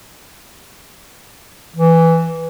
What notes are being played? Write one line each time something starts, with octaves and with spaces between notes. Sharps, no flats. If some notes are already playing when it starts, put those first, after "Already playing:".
E3